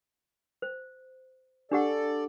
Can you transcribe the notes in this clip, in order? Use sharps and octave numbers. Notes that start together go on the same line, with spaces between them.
C5
D4 G4 A4 D5 F#5